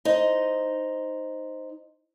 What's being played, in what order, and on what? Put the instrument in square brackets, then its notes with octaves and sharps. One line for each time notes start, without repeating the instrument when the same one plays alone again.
[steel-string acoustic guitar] D#4 C5